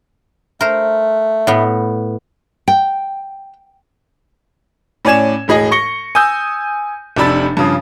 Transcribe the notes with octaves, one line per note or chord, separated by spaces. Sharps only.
A3 A#4 C5
A2 B3
G5
A2 C#4 D5 G#5 G#6 E7
E1 A2 G#4 D#5
C#6 A#6 C#7 G7
G#5 D#6 E6 G6
F1 C3 D4 B5 E6 A6
G2 C#3 F3